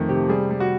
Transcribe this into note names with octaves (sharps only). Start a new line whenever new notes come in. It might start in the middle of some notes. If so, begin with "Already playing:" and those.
Already playing: F2 D#3 A3
C3 G4
G3 G#4
G3
F#4